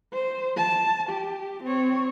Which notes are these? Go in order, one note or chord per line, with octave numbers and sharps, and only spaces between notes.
C5
A5
G4
C4 C#5